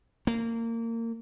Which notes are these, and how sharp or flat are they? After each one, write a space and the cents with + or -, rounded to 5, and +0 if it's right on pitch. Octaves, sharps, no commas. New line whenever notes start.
A#3 -25